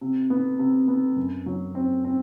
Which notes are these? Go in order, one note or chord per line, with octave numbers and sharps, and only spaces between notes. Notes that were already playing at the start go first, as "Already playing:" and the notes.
C3
B3
C3
B3
F#2
F#3
C4
C4